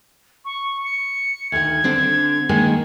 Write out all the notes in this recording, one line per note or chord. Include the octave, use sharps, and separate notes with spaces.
C#6
C#7
D2 D#3 G#6
D3 C4 D4
D#3 G#3 A#3